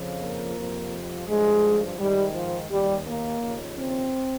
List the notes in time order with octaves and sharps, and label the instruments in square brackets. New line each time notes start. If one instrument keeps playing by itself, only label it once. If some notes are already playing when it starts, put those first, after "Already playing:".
Already playing: [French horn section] F2 C#3 F3
A#3
F2 C3 F3
G2 F3 G#3
G#2 D#3 G3
F3
D#2 D#3 G3
A#3
D#2 C#3 F3
C4